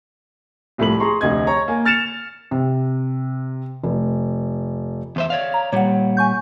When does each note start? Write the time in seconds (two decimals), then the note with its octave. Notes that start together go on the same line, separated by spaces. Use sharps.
0.78 C2 A2 F3 B5 F#7
1.00 G#4 A#5 C6 C#6
1.21 F1 D2 D#5 G#6
1.47 C#5 A#5 C#6
1.68 A#3 G#5
1.85 F6 A6 C#7 E7 F7
2.51 C3
3.84 F1
5.16 E2 C5 E5
5.30 C#5 D5 F5
5.54 A#5
5.73 A#2 G3 C#5 F#5
6.17 G#5 C#6 G6